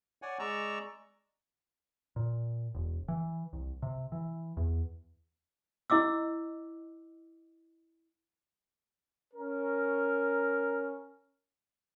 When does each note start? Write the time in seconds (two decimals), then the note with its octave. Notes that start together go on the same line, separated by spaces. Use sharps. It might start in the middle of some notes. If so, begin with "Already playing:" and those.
0.22 C#5 D5 F#5 G#5
0.39 G#3 D5 A#5 C#6 E6
2.16 A#2
2.75 E1
3.08 E3
3.53 C2
3.82 C3
4.12 E3
4.57 E2
5.90 E4 D#5 D6 E6
9.34 C#4 A#4